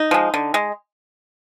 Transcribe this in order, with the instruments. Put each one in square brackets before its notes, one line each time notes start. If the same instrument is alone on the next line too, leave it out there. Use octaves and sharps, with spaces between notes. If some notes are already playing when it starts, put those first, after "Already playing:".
Already playing: [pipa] D#4
F3 G#3
D3
G#3